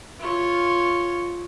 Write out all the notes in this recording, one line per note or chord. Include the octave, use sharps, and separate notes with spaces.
F4 C#5